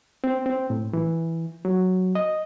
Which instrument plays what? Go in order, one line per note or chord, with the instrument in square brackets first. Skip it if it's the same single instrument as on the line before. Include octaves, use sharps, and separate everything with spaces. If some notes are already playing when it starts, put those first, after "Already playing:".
[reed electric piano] C4
C4
A2
E3
F#3
D#5